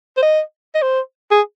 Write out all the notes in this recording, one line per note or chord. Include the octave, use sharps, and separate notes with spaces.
C5
D#5
D#5
C5
G#4